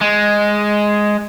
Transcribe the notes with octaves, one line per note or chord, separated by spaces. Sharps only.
G#3